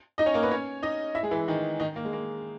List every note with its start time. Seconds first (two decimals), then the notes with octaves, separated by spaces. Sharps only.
0.18 D#4 D#5
0.26 C#4 C#5
0.34 A#3 A#4
0.43 B3 B4
0.51 C#4 C#5
0.83 D#4 D#5
1.15 E4 E5
1.23 G#3 G#4
1.31 E3 E4
1.48 D#3 D#4
1.80 D#3 D#4
1.96 A#3
2.05 G#3
2.13 A#3